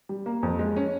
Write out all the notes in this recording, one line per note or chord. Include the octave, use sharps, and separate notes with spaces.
G3
A#3
F2
G#3
C#4